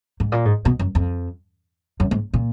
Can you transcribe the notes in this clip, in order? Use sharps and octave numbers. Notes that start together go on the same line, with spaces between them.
G#2
A#2
G#2
B2
F#2
F2
F#2
G#2
A#2